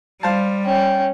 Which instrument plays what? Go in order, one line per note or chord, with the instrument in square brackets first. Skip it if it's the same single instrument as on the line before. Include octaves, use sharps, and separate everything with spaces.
[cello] G3 [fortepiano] C5 F5 A5
[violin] C#4 [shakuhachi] G5